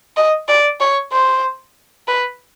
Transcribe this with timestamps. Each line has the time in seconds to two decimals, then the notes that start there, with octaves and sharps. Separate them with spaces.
0.16 D#5
0.48 D5
0.80 C#5
1.12 C5
2.08 B4